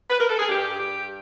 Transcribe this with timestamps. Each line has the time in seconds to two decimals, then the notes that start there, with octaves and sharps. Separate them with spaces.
0.10 B4
0.20 A#4
0.29 A4
0.39 G#4
0.49 G2 G4
0.78 G2 G4